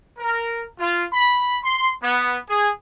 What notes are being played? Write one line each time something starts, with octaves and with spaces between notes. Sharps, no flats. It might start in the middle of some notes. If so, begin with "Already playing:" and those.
A#4
F4
B5
C6
B3
G#4